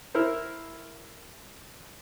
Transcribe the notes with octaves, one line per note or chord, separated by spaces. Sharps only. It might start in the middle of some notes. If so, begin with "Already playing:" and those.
E4 A#4 C5